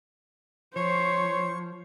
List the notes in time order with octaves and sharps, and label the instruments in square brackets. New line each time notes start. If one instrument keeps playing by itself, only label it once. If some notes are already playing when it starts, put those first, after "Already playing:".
[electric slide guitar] F3 [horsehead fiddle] C5 [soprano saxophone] C#5 [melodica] C#6